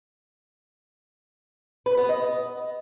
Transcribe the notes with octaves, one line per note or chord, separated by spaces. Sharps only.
B4
B3
D#5